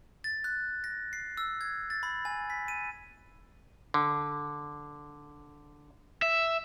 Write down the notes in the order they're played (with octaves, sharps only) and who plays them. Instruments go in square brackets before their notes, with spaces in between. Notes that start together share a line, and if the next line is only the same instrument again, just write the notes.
[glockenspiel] A6
F#6
A#6
C7
E6
G#6
A6
B5
G#5
B6
D#7
[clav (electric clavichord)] D3
[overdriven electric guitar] E5